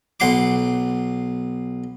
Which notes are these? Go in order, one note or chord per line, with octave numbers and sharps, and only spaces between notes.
B1 F#5 C6 D6